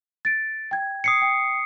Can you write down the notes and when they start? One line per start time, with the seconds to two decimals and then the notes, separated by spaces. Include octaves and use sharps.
0.25 A6 D7
0.71 G5 G#6
1.04 D#6 C7 C#7
1.22 G5